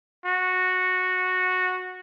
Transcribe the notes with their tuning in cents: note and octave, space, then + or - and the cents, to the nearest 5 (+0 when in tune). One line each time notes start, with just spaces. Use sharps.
F#4 -10